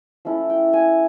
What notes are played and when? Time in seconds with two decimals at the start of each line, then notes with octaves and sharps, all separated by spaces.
0.25 F3 A3 C#4 E4
0.50 G5
0.73 G#5